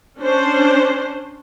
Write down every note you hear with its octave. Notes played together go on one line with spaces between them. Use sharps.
C#4 D4 C5